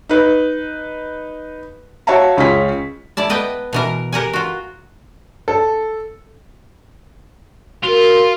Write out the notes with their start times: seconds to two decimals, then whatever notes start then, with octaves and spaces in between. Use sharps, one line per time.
0.09 D#4 B4
2.07 F#4 C#5 E5 F5 A5 A#5
2.37 C#2 C#4 F4 G#4 B6
3.17 E4 D5 A5
3.29 B3 B4 D#5 G5
3.73 B2 E3 A#4
4.13 G4 A#4 F#5 G#5
4.33 F4 F#4
5.48 A4
7.83 F4 F#4 A#4